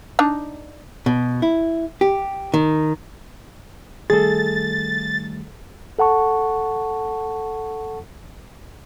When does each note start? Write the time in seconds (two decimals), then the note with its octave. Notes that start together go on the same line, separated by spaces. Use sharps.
0.19 D4 D#4
1.06 B2
1.42 E4
2.01 G4
2.54 D#3
4.10 D#3 G3 A3 G#4 A4 A6
5.99 A4 F#5 A5 C#6